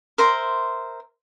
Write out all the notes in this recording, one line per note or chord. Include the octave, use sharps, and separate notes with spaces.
A#4 C5 E5 C6